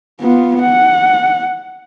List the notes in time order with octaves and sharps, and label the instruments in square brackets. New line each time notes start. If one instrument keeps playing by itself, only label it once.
[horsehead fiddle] B3 F4
F#5